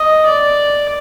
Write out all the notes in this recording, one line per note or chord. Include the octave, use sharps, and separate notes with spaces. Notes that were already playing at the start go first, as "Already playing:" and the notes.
Already playing: D#5
D5